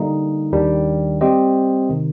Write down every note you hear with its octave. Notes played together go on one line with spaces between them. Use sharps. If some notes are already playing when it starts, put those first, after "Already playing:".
Already playing: D3 G3 A#3 D#4
D#2 D#3 G3 D4
G3 C4 G4 C5 D#5
C3 D#3